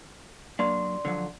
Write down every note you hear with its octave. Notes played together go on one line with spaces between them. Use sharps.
F#3 A#3 D4 D5 C6
D3 F3 F#3